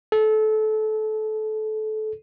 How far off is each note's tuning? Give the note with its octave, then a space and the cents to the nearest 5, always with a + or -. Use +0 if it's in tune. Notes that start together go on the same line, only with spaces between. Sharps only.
A4 -25